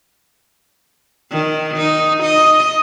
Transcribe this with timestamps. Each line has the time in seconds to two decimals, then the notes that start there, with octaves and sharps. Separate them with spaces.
1.31 D#3
1.77 D#4
2.23 D#5